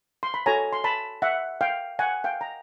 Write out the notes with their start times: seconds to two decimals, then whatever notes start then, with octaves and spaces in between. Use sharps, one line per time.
0.23 C6
0.34 B5
0.46 F#4 A4 C#5 G#5 A#5
0.73 C6
0.84 A5 B5
1.22 E5 F#5
1.61 F5 G5
1.99 F#5 G#5
2.24 F5 G5
2.41 A#5